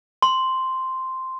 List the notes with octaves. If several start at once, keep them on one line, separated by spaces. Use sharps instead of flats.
C6